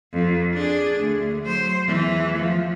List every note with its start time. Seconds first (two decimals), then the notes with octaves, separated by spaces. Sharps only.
0.13 F2
0.53 D4 G#4
1.00 D2
1.46 F#3 C5
1.87 E2 E3
2.37 F3